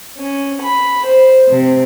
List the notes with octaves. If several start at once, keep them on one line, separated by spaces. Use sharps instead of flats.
C#4
B5
C5
C3